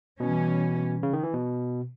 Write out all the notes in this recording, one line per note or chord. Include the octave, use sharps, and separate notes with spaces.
B2 E3 G3 C#4
C#3
D#3
E3
B2